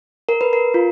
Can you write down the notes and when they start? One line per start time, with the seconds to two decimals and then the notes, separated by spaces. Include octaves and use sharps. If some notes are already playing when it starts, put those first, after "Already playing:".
0.29 A#4
0.41 B4
0.53 A#4
0.74 F4